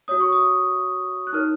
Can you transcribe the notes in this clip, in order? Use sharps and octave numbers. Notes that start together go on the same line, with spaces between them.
F#4 C#5 D#6
C#6
D#6
F#6
D#4 A#4 C#5 F6